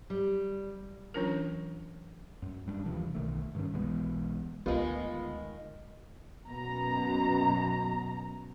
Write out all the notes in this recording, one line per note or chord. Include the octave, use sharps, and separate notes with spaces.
G3
E3 F#3 C#4 D4 F4 A#4
F#2
F#2 G3 C4 D4
D#2 C3 E3 F3
B1 D#3 A3
G2 D#3 C#4
B1 E3 G#3 B3
D2 D#3 G#3 B3 F4
F#2 B2 A#5